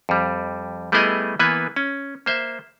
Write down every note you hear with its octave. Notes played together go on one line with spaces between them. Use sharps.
F2 G3
G3 A3 B3 E4 G#4 D#5
E3 A#3 B3 B4 G#5
C#4
A#3 C5 E5